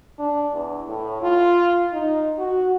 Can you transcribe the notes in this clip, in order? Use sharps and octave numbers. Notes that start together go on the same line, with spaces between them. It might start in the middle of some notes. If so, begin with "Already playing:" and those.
D4
E2
A2
F4
D#4
F#4